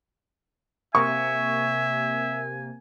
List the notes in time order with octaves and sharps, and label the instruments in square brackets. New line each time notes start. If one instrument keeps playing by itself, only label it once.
[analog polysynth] C3 A#3 [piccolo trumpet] E5 [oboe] G#5 [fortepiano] C#6